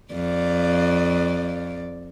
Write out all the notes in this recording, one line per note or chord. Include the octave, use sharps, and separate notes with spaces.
F2 D5